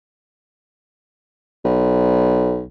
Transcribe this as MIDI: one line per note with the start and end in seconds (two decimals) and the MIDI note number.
1.65 2.65 35